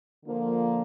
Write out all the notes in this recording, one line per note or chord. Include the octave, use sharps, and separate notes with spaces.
D3 F3 A#3